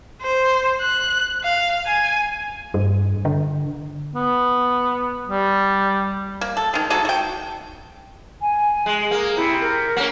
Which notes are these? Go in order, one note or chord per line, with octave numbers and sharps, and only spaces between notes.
C5
F#6
F5
G#5
G2
D3
B3
G3
A#3
A4
D#3 G#3
G#3 D#4 F#4 A4
F#4 G5
G#5
G#3
A#3 G#4
C3 E4
A#4
A#3 C#4